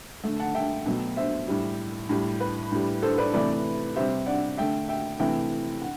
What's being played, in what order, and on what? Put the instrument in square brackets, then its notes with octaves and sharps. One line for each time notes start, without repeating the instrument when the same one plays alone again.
[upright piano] D3 A3
F#5 A5
E5 G5
B2 F#3 A3
C5 E5
A2 G3
A2 G3
B4
A2 G3
A4 C5
B4 D5
C3 E3 A3 B4 D5
C3 G3 C5 E5
D5 F#5
D3 A3 E5 G5
E5 G5
C3 E3 A3 E5 G5
F#5